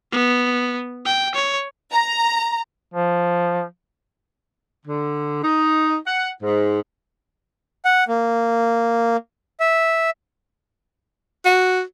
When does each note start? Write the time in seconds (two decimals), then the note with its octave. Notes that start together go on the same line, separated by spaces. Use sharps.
0.12 B3
1.06 G5
1.35 C#5
1.93 A#5
2.94 F3
4.86 D3
5.42 D#4
6.06 F#5
6.43 G#2
7.85 F#5
8.08 A#3
9.60 E5
11.45 F#4